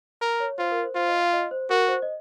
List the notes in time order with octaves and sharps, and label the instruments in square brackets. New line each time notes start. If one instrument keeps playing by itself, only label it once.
[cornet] A#4
[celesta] C#5
[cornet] F4 [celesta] C5
[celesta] A#4
C5
[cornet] F4 [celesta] C5
[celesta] D#5
F5
D#5
C5
[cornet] F#4 [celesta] A#4
[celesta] C5
D#5